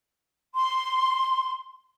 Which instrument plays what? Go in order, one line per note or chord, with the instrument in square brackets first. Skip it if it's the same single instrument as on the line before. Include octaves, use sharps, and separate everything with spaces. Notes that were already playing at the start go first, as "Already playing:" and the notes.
[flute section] C6